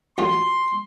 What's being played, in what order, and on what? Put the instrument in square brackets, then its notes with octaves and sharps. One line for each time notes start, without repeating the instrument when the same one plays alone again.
[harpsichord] A1 F#2 F4 [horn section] C6